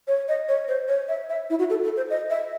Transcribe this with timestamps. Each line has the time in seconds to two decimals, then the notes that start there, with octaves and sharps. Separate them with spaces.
0.07 C#5
0.28 D#5
0.48 C#5
0.68 C5
0.88 C#5
1.09 E5
1.30 E5
1.50 E4
1.59 F#4
1.70 A4
1.84 A4
1.96 C5
2.10 D#5
2.30 E5